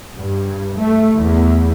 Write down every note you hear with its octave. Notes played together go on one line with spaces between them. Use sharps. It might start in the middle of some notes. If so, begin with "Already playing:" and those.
G2
A3
E2